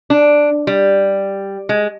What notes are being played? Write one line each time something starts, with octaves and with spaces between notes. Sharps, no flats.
D4
G3
G#3